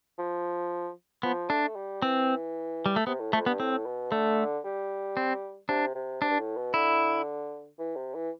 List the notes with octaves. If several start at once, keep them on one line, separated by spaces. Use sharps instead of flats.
F3
F3 B3
A3 D4
G3
E3 C4
G3
A3
C3 B3
A2
F2 A3
G2 B3
A2 C4
B2
D3 A3
G3
C4
C3 D4
C3
C3 D4
G2
A2
B2
D3 E4
E3
C3
E3